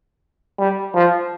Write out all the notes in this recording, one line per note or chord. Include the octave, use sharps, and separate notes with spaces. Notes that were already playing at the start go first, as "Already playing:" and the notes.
G3
F3